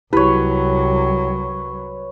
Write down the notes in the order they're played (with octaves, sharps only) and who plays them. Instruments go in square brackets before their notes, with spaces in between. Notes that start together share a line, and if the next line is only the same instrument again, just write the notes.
[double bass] C2 F#3 [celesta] E4 G4 [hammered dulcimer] B4 C#5